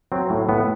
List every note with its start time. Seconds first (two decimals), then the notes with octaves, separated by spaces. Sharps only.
0.12 F#3 C4
0.30 A2
0.49 A2 B3